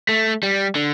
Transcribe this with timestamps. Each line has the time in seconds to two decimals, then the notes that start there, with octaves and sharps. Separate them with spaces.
0.09 A3
0.43 G3
0.75 D3